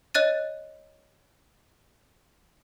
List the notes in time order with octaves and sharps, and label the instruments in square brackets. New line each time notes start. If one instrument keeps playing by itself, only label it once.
[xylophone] C#5 D#5 F#6 A6 D#7